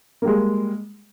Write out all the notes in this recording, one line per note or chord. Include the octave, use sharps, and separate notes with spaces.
G3 G#3 A#3